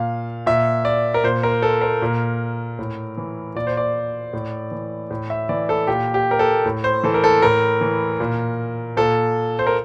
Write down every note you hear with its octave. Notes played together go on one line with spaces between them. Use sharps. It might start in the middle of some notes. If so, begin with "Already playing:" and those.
Already playing: A#2 F5
A#2 E5
D5
A#4
A#2 C5
A#4
A4
A#4
A#2
A2
E3
A#2 D5
C5
D5
A2
E3
A2
E5
E3 D5
A4
A#2 G4
G4
A#4
A4
A2
C5
E3 A4
A#4
A4
A2 A#4
E3
A#2
A#2 A4
C5
A#4